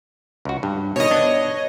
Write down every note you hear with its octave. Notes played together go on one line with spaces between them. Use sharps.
C#2 F#4
G2
B2 D#3 C#5 D#5
B3 D4